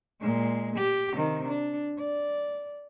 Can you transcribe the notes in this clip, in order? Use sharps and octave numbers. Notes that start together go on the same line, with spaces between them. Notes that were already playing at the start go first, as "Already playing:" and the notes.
A#2 G#3
G4
C3 D#3
D4
D5